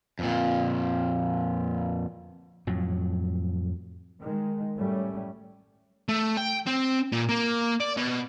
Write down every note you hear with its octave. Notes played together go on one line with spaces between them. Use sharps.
F2 A#2
F2 A2 F#3
D#3 G#3
F#2 A2 G3 A3 C#4
A3
G5
C4
A#2
A#3
D5
B2